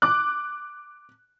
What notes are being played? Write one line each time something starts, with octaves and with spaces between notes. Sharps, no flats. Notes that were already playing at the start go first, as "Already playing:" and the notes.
D6 F#6